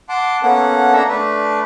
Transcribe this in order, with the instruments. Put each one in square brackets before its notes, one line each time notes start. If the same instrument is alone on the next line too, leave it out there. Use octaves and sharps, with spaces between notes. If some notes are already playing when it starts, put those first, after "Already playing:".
[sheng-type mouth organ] F#5 A5 C6 D6
A#3 B3 C#4 A4 F#5
D4 A4 E5 A#5
A3 D4 B4